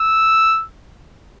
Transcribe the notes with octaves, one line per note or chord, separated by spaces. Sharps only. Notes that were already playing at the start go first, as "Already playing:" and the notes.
Already playing: E6